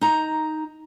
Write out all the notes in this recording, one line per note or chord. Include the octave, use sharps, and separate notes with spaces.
D#4 A#5